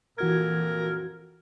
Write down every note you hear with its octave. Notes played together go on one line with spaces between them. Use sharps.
F2 A#2 E3 F#4 A#4 G#6